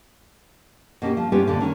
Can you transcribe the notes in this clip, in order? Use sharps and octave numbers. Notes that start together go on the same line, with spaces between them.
B2 A#3 C#4 G4
F3
B3 C#4 D4 F4 G4
F2 A#2 D3 F3
D#3 C#4 G#4 C#5